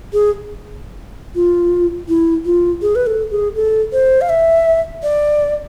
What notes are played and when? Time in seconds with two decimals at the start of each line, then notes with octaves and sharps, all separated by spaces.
0.13 G#4
1.35 F4
2.09 E4
2.45 F4
2.82 G#4
2.95 B4
3.07 A4
3.31 G#4
3.56 A4
3.93 C5
4.21 F5
4.29 E5
5.03 D5